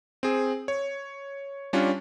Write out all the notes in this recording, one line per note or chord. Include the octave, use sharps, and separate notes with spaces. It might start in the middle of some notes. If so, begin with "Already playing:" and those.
C4 G#4
C#5
G3 C#4 D4 F4